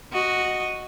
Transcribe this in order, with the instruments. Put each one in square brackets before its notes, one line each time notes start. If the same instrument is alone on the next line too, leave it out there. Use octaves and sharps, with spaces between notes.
[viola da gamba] F#4 D#5